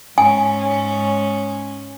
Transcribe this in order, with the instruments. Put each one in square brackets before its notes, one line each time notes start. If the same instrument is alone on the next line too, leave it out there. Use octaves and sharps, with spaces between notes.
[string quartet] G#2 C#4 [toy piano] G#5